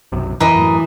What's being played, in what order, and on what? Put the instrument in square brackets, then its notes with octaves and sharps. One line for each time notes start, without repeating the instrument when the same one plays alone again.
[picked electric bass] B1 F#2 C3
[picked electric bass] F2 [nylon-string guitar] E3 [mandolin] A#3 D#5
[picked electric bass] F#2 A2